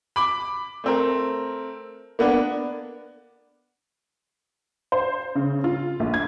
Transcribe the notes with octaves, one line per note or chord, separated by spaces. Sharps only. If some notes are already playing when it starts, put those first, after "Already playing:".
B5 D6
A3 C4 A#4
A#3 B3 D4
C5
C#3
F4
A#1
G#6